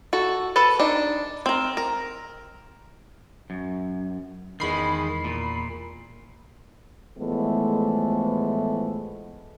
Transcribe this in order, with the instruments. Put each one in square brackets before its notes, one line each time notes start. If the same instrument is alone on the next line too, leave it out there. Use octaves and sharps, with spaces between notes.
[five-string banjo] F#4 A4
A4 B4 A5
D4 D#4
C4 A#4
A#4
[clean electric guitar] F#2
[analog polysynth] E2 B5 C7 [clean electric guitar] D#3 G#3
[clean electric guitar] A#2
[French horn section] A2 E3 F3 G#3 A3 B3